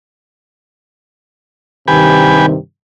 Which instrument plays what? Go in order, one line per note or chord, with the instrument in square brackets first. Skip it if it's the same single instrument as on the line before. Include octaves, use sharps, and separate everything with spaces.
[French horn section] G2 C3 D#3 [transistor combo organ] G4 B4 G#5